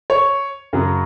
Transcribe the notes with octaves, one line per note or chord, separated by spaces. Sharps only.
C#5
F#2 C#3 F#3